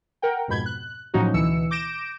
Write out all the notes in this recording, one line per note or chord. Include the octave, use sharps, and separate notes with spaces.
A#4 F#5 G5
F2 G#2 B2 B5 G6 G#6
F#6
A2 F3 F#3 C#4 D#4 F#4
D2 B2 E3 E6 C#7
D6 G6 A#6 D7 E7